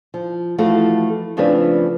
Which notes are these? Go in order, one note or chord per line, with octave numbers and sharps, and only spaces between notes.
F3
E3 F3 A3 F4 F#4 A4
C#3 F3 A3 C4 D4 B4